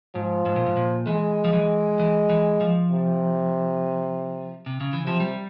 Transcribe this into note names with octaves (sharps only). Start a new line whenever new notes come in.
G#2 F3
G#2
A#2
G#2
A#2
E3 G#3
F3
E3
E3
E3
F3
C3
C3
C#3
E3
C3 F3
G3